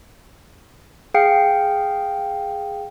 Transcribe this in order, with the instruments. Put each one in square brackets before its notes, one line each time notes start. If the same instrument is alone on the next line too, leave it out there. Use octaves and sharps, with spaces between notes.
[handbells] G#4 F5 G5 C7 C#7